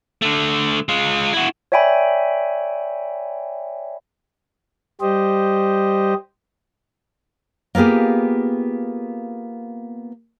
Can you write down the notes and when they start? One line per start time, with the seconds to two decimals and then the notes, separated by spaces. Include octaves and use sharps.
0.22 D3 A3
0.89 G#3 F4
1.33 E4 F#4
1.72 C#5 D5 E5 G5 G#5 B5
5.01 G3 G4 C5 D#5
7.75 A#3 B3 F4 G4 G#4